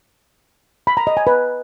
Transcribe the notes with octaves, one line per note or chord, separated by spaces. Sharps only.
B5
A#5
D#5
G#5
B4